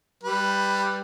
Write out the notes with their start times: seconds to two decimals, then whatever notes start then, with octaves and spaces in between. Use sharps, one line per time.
0.23 G3 B4